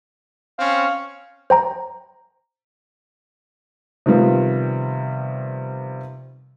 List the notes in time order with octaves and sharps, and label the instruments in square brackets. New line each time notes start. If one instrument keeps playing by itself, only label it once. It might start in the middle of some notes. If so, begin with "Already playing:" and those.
[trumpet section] C4 C#4 [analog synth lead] F5
[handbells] C5 G5 A#5
[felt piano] C3 D#3 F3 G3 B3 F4